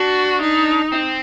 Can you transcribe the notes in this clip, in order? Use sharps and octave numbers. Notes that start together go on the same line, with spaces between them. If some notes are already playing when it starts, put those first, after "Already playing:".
Already playing: D4 F#4
D#4
C4